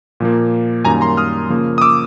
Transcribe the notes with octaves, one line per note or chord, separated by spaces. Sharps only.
A#2 F3 A#3
F#2 D#3 G3 A#3 G#5 A#5
A#5 C6
D#6 F6
C#3 F3 A#3
D#6
D6 E6